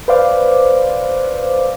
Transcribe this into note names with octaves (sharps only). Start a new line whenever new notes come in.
B4 C5 D5 F5 D6